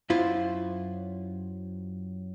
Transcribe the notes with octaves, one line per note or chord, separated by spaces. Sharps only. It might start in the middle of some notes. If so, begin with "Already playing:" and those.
F#2 E4 F4 C5